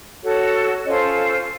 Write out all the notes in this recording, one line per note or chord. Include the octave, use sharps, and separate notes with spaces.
F#4 A4 C#5
C#4 F4 A4 C5 C#5 D#5